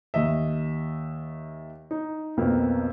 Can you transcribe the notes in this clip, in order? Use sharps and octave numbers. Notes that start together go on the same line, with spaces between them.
D#2 D#5 E5
D#4
B1 F2 A#3 B3